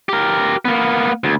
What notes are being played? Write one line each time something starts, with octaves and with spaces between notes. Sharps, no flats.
G4 A#4
A#3 B3
D2